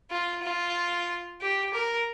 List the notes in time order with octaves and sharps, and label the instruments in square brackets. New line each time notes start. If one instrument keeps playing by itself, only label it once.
[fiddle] F4
F4
G4
A#4